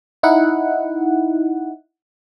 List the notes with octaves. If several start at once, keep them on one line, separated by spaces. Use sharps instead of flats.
D#4 E4 F#5